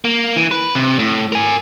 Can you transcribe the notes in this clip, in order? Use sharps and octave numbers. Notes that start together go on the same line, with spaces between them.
A#3
E3
B4
C3
A2
A#4 G#5